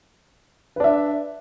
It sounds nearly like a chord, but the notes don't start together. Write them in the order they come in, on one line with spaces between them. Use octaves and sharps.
B4 D4 E5